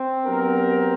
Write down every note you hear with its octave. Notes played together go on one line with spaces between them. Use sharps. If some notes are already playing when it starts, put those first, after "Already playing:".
Already playing: C4
F#3 B3 D4 G4 A#4